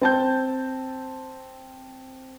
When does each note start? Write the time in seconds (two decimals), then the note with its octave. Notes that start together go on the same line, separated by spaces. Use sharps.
0.01 C4 A5 G6